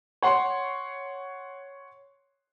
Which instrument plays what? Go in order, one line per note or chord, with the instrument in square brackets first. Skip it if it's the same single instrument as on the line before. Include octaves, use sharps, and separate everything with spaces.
[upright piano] C#5 F#5 C6